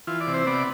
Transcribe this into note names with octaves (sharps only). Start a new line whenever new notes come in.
E3 F4
D5
C3
C5
B3 D5